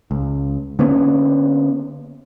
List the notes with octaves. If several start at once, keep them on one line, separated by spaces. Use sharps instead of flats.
C#2
D3 A#3 B3 C#4